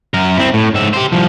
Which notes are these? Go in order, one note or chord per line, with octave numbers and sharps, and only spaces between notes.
F#2 A#4
C4 E4
A2
G#2 E5
G4 C5
C2 F3